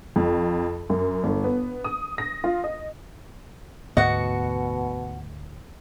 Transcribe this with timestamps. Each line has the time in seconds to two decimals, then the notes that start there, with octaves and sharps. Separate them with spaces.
0.16 F2
0.90 F#2
1.24 G1
1.44 B3
1.84 D#6
2.18 A#6
2.44 F4
2.64 D#5
3.97 D2 G#2 B2 B3 F#4 D#5 F#5